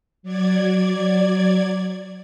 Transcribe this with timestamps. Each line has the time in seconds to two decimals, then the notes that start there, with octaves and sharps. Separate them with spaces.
0.23 F#3 D5 G#6